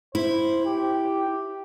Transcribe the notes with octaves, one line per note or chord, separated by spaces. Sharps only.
E4 C5
G4